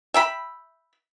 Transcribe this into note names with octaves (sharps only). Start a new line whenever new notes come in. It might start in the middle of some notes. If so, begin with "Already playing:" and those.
E5 G5 B5